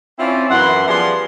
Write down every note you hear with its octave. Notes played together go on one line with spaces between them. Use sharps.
C4 C#4 E4 F4 C5 D5
F#2 E3 E4 F#5 C6
F3 G3 B3 G#4 D5 C6